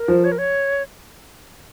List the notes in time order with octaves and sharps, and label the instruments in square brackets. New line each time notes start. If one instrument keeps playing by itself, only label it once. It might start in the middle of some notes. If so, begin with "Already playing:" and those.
Already playing: [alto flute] A#4
[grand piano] F3
[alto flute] C#5
A#4
C#5